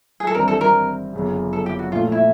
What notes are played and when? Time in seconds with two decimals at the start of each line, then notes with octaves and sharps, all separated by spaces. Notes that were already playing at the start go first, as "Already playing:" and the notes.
0.20 G#4
0.27 A4
0.35 G#1 G2 E3 G3 C4 A#4
0.48 A4
0.61 A#4
1.13 G1 F#2 C#3
1.53 A4
1.66 G4
1.79 F#4
1.92 A#2 F3 A3 F4
2.12 E4